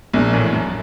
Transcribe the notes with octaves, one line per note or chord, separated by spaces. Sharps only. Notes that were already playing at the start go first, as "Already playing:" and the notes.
A#1 A#2
A1 A2
F#2